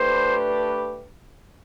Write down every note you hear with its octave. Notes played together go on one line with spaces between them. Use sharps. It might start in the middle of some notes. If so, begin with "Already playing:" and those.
Already playing: A3 D4 G4 B4 C5